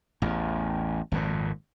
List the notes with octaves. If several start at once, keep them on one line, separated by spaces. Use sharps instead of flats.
A1 E2
G#1 F2 A#2